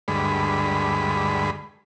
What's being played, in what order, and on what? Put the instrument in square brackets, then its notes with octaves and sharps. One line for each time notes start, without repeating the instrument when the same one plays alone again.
[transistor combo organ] D2 G2 G#3 B5